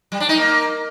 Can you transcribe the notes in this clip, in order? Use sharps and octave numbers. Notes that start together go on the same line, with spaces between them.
G3
D4
D#4
A#3